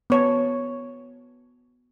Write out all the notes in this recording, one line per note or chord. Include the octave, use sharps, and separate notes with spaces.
B3 C#5 A5